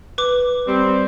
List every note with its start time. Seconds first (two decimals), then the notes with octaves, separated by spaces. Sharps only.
0.18 B4 D6
0.68 G3 C4